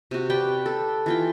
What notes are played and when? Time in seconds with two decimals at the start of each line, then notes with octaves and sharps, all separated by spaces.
0.11 C3 F#4
0.30 G4 B4 D5 G5
0.66 A4
1.06 E3 F4 G5